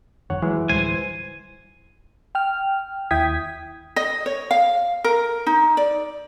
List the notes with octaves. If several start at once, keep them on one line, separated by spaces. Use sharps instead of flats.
G1 F#2 D#3 C#5 F#5
E3 F#3 G#3
D1 G3 C5 G#5
G5 F6
D#2 E4 G5 D#6 G#6 B6
D#5
C#5
F5
A#4
D#4
D5